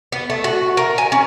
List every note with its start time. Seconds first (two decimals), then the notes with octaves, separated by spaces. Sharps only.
0.12 B3
0.30 A3
0.44 F#4
0.77 A#4
0.98 G#5
1.12 C#4